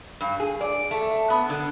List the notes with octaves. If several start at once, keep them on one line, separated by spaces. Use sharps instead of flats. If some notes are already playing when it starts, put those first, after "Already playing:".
G2
G#4
D5
A3
B3
D3